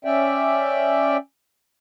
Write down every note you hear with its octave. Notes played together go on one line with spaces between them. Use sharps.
C#4 D5 E5 G5